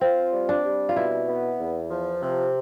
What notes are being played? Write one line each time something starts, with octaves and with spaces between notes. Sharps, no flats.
C4 F4
G3
D4
G3
F4
B2 E4
B3
E2
F3
C3